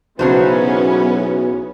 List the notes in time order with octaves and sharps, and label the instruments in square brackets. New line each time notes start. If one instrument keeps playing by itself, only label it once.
[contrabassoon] B1 [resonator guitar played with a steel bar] C#3 F#3 C5 [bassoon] E3 [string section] B3 C#4